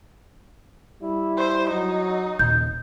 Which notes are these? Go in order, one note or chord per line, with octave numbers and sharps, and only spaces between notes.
G3 E4
C5
F#3 D#4
D#1 C#3 G6